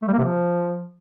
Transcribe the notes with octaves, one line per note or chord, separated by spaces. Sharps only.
A3
G3
A#3
C3
F3